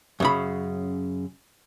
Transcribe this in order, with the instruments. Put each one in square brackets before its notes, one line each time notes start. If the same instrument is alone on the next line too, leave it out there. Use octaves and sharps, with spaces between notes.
[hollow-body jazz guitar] F#2 C#3 B5